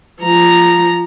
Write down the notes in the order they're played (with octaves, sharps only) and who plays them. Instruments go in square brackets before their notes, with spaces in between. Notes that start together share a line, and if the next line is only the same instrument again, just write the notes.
[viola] F3 A#5